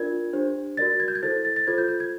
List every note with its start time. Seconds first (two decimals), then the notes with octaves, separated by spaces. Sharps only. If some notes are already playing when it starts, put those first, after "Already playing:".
Already playing: D4 F4 A#4 D5 G#6
0.33 D4 G4 C5
0.77 F#4 A#4 D5 A6
1.00 G#6
1.08 G6
1.15 G#6
1.23 E4 A4 C5 A6
1.45 A6
1.56 A6
1.67 F4 A4 C5 G#6
1.78 G6
1.88 G6
2.00 G#6